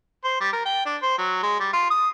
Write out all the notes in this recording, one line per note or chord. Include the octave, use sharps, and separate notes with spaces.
C5
G3
A#4
G5
D4
C5
F#3
G#3
G3
F4
D#6